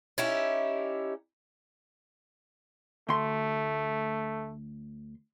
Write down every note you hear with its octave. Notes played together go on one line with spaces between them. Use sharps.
C#4 D#4 E4 G4
D2 A3 C6